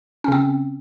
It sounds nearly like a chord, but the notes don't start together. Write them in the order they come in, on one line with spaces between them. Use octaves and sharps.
C#4 C#3 C4